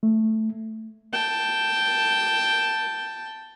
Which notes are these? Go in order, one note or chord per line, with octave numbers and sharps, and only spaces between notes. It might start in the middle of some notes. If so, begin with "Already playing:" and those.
A3
G5 A5